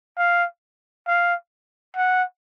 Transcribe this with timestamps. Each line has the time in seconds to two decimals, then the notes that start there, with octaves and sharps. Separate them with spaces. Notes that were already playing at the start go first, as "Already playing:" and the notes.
0.18 F5
1.07 F5
1.96 F#5